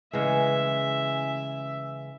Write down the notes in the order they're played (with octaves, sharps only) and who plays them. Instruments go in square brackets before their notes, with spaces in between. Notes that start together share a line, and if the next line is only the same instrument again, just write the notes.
[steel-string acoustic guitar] C#3 E3 G#3 [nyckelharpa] E5